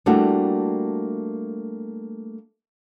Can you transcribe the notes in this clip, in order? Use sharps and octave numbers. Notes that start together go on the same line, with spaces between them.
G3 A3 A#3 D4 E4 F#4